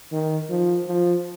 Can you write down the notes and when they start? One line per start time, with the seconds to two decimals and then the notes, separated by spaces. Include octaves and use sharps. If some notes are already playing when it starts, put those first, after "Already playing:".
0.12 D#3
0.50 F3
0.88 F3